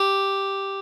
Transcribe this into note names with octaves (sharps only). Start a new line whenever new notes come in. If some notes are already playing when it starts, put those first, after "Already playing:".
Already playing: G4